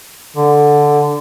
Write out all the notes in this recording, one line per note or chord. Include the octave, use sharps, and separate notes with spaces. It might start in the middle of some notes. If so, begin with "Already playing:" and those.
D3